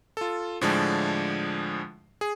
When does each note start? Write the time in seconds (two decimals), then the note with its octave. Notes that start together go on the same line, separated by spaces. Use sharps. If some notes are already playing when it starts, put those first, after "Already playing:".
0.17 F4 A4
0.61 A2 D3 F3 G#3 D4
2.21 G#4